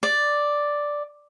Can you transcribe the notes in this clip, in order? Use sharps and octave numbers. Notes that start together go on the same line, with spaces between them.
D5